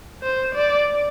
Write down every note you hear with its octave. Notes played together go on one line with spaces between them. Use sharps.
C5
D5